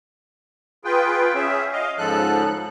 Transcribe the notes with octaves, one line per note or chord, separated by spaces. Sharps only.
F4 G#4 B4 G5
C#4 G#4 E5
D#5 F5
G#2 C#3 F3 A4 F#6